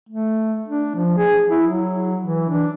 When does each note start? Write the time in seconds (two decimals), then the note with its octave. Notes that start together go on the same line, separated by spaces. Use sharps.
0.09 A3
0.68 D4
0.95 F3
1.18 G#4
1.49 E4
1.67 F#3
2.22 E3
2.49 D4